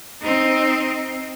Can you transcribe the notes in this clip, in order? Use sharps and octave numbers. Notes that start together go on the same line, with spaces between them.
C4 D#4